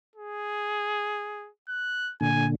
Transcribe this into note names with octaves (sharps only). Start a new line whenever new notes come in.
G#4
F#6
A#2 D3 G#5